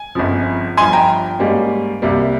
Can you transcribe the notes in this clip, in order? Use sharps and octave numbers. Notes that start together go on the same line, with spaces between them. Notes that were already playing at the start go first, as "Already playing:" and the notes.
Already playing: G#5
G1 F2 C#3 F3
G1 G2 F3 G#5 C6
G5 A#5
G#2 G3 A#3 C#4
C2 C3 G3 A#3